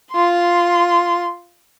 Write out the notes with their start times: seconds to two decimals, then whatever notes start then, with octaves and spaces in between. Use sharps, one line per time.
0.12 F4 C6